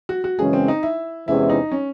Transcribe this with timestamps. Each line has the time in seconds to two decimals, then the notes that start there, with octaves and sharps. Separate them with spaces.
0.09 F#4
0.24 F#4
0.39 F#2 C#3 E3 G#3 C#4 G#4
0.53 C4
0.68 D#4
0.83 E4
1.27 E2 C3 E3 G#3 C#4 E4
1.50 D#4
1.72 C#4